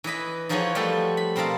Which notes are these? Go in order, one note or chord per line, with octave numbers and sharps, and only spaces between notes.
E3 B4 D#5 B5
E3 F3 D#4 F#4 G#4 C#5
F3 G3 A3 F#4 A4
B5
B2 C4 A#4 F5 A5